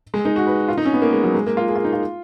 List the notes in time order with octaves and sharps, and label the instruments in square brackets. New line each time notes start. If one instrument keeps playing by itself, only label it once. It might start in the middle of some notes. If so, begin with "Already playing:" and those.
[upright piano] G#3
D#4
F#4
B4
F4
D#4
C#4
B3
A#3
G#3
F#3
G#3
A#3
F4
G#4
F4
D#4
F4